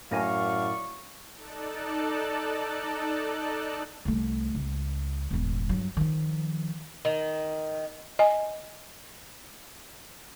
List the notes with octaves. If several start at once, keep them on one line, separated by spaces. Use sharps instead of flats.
F#2 A2 A#4 D5 F5 G#5 C#6
D#4 A4 D5 A5 F#6
C2 A3
C#2
E1 A1
G2 F#3
D#3 F3
D#3
D#5 G#5